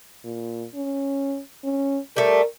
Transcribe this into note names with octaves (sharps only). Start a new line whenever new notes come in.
A#2
C#4
C#4
G3 A3 A#4